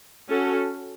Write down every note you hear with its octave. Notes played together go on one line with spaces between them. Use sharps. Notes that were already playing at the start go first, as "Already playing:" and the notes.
C#4 F#4 A4